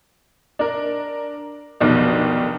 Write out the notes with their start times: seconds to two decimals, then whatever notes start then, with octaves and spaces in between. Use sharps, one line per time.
0.59 D4 A#4
1.80 F1 B1 B2 D#3 D4